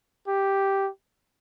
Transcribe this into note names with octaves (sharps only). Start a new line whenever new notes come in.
G4